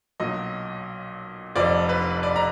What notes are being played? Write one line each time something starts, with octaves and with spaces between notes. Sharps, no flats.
B1 A#2 F#3 D#5
F1 F2 F3 D5
B4
D5
A#5